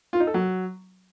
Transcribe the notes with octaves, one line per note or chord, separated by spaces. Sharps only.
F4
D#4
A4
F#3